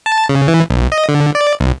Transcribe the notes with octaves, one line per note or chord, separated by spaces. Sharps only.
A5
C#3
E3
B1
D#5
D3
D5
C2